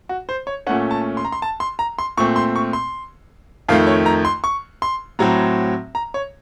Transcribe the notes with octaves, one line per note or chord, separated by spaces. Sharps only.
F#4
C5
C#5
A#2 A3 C#4 F#5
A5
C6
A#5
C6
A5
C6
A#5
C6
A#2 A3 C4 C#6
C6
C#6
C6
F2 D#3 A3 F5
C#5
A#5
C6
C#6
C6
A2 F#3 C4 A#5
A#5
C#5